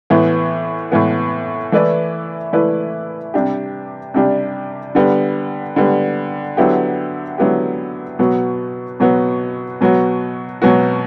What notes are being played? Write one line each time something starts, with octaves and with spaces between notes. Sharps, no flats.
A2 E3 B3
A2 E3 B3
E3 A3 E4 B4 D5
E3 A3 E4 B4 D5
C3 G3 D4 G4
C3 G3 D4 G4
D3 G3 B3
D3 G3 B3
D3 F#3 B3 E4 G4
D3 F#3 B3 E4 G4
B2 F#3 B3 F#4
B2 F#3 B3 F#4
B2 F#3 B3 F#4
B2 F#3 B3 F#4